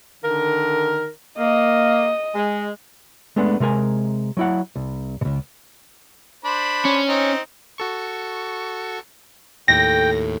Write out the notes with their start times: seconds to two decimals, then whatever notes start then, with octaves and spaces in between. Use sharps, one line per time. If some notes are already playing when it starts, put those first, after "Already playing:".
0.23 D3 D#3 A#4
1.38 A#3 D#5
2.35 G#3
3.36 G#3 A3 B3 D4
3.60 C3 G#3 A#4 G#5
4.37 F#3 E4 F#5
4.76 C2
5.21 C#2 B2
6.45 D4 C5 B5
6.85 C#4
7.08 C4 D#4
7.78 F#4 A4 C#6
9.68 D#2 A2 A3 G5 A#6